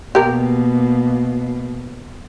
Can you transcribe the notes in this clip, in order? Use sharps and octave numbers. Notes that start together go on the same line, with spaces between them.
B2 A#3 G4 A#4